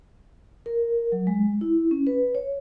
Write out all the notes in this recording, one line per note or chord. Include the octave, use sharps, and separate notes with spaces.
A#4
F#3
G#3
E4
C#4
B4
C#5